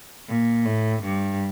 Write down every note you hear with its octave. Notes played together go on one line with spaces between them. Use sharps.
A#2
A2
G2